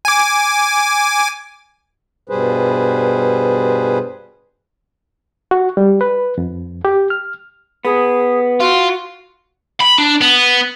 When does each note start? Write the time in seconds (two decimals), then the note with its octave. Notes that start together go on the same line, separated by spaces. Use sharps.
0.05 G#5 D6
2.29 G2 B2 G3 G#4 B4 C5
5.51 F#4
5.77 G3
6.01 B4
6.38 F2
6.85 G4
7.10 F6
7.85 B3 G#4
8.60 F4 F#4
9.81 B5
9.98 D4
10.21 B3